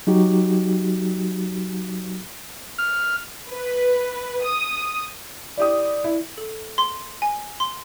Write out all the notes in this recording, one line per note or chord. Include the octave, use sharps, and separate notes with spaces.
F#3 D#4 F#4 G4
F6
B4
D#6
E4 G4 D5 D#6
E4
A4
C6
G#5
C6